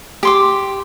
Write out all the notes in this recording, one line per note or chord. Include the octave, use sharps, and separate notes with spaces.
G4 C6 D6